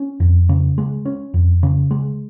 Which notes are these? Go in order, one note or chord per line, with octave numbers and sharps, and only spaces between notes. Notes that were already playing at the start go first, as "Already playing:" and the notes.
Already playing: C#4
F2
C#3
G#3
C#4
F2
C#3
G#3